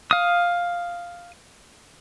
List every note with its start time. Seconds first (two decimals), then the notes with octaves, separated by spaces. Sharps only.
0.11 F5 D#6